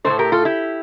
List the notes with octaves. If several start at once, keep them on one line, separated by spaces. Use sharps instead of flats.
E3 A3 A4 C5
A2
G4 A#4
F4 A4
E4 G4